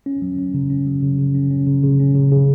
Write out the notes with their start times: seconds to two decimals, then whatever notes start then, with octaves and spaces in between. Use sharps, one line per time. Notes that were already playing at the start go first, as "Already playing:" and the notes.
0.06 C#4
0.22 F#3
0.39 C#4
0.54 C#3
0.70 C#4
0.87 F#3
1.03 C#3
1.19 C#3
1.35 C#4
1.51 C#4
1.67 C#3
1.83 C#3
2.00 C#4
2.15 C#3
2.31 C#3